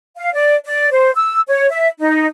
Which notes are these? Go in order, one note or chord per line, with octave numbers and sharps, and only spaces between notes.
F5
D5
D5
C5
E6
C#5
E5
D#4